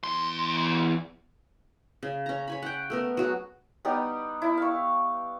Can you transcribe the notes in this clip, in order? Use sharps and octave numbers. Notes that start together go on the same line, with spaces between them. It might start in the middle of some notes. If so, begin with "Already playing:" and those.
E2 C6
C#3
C#4 A#5
C#5 G#5 B5
F#5 G5
A3 B3 A#4
F#3 F#4 G#4
G3 B3 D#4 G4
E4
F5 C#6